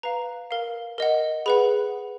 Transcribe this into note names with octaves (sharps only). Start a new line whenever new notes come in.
B4 F5 A#5
A#4 F5
A#4 D#5 F#5
G#4 B4 F#5 B5